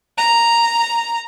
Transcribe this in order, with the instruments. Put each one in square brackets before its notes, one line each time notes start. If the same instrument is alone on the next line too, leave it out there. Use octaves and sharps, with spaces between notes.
[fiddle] A#5